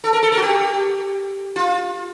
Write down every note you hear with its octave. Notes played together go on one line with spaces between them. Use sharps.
A4
A#4
A4
A#4
F#4
G4
F4